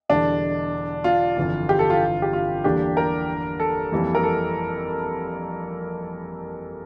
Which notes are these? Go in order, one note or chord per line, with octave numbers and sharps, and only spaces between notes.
E1 E2 D3 G3 D4
F4
G1 F2 E3
G4
A4
F4
G4
F4
E2 D3 G3 A#3 D4 G4
A#4
A4
F2 E3 G3 A#3
A#4
A4